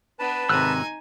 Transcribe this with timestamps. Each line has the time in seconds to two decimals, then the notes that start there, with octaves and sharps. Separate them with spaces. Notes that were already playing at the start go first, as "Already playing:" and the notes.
0.19 B3 D4 B4 A5
0.49 G#1 C3 D#4 G#5 E6 F#6